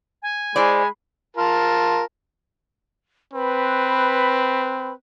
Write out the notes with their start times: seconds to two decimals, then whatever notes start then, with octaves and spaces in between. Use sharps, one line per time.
0.22 G#5
0.56 G#3 E4 C5 D5 B5
1.37 F4 A#4 A5
3.33 C4 B4 B5